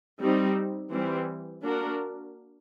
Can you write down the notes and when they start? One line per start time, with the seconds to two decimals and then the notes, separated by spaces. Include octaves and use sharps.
0.21 G3 C4 D#4
0.91 E3 G3 C4
1.61 A#3 D4 F#4 A#4